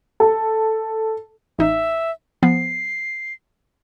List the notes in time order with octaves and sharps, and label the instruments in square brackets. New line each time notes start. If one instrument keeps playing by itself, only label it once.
[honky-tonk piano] A4
[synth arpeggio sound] A1 D#4 [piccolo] E5
[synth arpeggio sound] F3 B3 [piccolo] C7